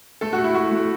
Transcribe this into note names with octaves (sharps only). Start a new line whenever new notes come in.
A3 A4
F#4
A3
E4
A3 F#4
A3